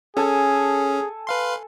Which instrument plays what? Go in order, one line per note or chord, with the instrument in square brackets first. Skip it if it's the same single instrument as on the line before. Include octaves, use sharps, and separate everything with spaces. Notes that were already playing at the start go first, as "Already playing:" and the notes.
[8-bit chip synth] C#4 [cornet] G#4 [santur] A4 G#5
[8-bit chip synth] B4 F5 C6